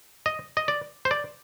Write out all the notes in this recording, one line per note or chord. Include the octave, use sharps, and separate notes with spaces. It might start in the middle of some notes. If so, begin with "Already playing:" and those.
D#5
D#5
D5
C5
D5